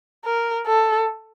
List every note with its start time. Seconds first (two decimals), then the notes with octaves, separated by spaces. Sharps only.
0.25 A#4
0.67 A4